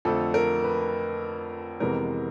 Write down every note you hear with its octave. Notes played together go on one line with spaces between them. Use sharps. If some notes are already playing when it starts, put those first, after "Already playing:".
F2 D3 F3 A3 A4
A#4
B4
F2 C3 E3 G#3 B3 A#4